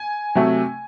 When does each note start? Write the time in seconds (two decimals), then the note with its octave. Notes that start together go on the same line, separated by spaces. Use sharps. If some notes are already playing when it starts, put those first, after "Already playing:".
Already playing: G#5
0.35 C3 F#3 A3